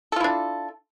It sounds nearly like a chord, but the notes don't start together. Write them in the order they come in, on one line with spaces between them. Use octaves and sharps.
A4 F4 E4 D4